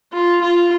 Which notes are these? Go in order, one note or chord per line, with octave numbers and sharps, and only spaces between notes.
F4
F4